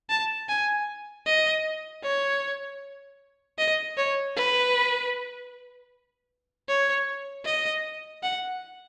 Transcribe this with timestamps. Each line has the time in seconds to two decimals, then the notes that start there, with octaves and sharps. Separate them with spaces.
0.10 A5
0.49 G#5
1.26 D#5
2.03 C#5
3.58 D#5
3.97 C#5
4.36 B4
6.69 C#5
7.45 D#5
8.23 F#5